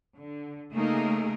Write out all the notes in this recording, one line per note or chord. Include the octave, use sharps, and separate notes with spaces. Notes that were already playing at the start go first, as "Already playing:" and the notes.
D3
C#3 A3 A#3 D#4 G#4 A#4